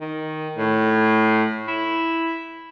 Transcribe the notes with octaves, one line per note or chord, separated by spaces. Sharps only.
D#3
A2
E4